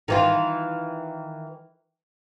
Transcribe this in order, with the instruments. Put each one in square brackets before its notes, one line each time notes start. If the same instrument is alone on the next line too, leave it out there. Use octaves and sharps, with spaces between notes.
[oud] D#3 E3 F4